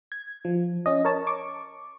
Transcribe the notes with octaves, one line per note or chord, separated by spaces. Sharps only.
G#6
F3
C#4 D#5
A#4 C#5 A5
C#6 D6